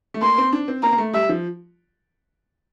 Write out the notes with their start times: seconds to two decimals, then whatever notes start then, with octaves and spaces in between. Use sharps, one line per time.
0.14 A3
0.22 A#3 C6
0.38 C4
0.53 D4
0.68 C4
0.83 A#3 A#5
0.93 A#3
0.98 A3
1.13 G3 E5
1.29 F3